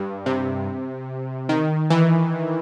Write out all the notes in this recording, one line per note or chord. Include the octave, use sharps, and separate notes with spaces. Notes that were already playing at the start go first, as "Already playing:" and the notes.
Already playing: G2
C3
D#3
E3